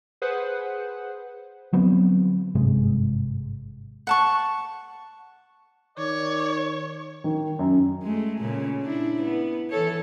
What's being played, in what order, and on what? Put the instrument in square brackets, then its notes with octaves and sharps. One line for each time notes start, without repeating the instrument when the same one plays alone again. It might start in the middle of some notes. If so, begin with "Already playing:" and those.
[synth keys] G#4 B4 C5 F#5
[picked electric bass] D3 F#3 B3 C4
G#1 G2 C3 G#3
[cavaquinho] F#5 A5 C#6
[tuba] D#3 [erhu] C#5 [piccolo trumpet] D5
[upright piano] D#3
F#2
[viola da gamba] G#3 A3
A#2 C#3
D4 E4
B3
E3 A4 C#5